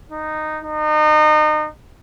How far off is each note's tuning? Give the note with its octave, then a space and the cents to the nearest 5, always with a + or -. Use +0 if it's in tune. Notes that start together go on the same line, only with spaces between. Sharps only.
D#4 -10
D#4 -30